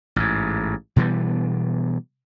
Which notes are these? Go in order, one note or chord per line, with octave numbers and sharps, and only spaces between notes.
A1 G#2
B2 E3 G3 B3